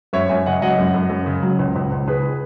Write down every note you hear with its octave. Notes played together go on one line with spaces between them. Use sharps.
F#2 C#5 E5
F#2 E5 G#5
C#3 D#5 F#5
F#3 D#5 F#5
F#2
F#2
F#2
C#3
F#3
C#2
C#2
C#2
C#2 G#4 B4